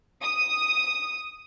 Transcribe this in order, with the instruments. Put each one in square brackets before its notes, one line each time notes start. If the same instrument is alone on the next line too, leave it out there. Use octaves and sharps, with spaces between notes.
[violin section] D#6